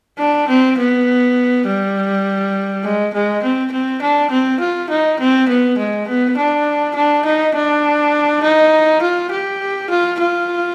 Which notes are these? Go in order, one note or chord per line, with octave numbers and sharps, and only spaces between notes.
D4
C4
B3
G3
G#3
G#3
C4
C4
D4
C4
F4
D#4
C4
B3
G#3
B3
D4
D4
D#4
D4
D#4
F4
G4
F4
F4